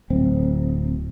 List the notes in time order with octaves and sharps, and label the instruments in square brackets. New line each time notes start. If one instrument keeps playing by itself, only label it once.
[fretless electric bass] D1 C4